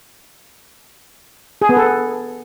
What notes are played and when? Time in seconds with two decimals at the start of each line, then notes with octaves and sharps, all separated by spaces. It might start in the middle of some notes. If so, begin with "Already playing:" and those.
1.62 G#4
1.69 B3
1.77 A4